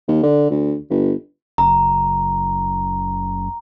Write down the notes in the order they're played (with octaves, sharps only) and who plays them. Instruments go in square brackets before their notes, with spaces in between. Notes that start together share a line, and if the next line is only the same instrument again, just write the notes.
[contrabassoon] D#2
D3
D2
G1
[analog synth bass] F#1 [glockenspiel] A#5